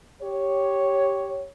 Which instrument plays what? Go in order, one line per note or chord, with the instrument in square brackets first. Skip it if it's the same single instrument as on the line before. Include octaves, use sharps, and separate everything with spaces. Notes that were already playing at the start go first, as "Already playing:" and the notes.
[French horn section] G4 C#5